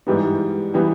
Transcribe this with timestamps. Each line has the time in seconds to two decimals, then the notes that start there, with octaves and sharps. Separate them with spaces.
0.07 G#2 E3 G3 B3
0.74 E3 G3 B3